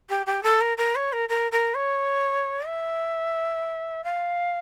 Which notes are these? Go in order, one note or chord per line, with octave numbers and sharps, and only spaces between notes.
G4
G4
A4
A#4
A#4
C#5
A#4
A#4
A#4
C#5
E5
F5